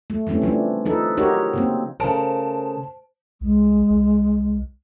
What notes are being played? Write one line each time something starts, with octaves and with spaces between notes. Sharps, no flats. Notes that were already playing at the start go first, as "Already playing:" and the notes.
A3
E3 G3 A3 C4 C#4
C#3 F3 A3 D4
F3 D#4 A4 B4
D#4 F#4 G4 A#4 C#5
C#3 A#3 C4
C#3 A3 A#4 C5 A5 D7
C2 G#3
C2